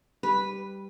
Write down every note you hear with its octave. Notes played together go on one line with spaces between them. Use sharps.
G3 B4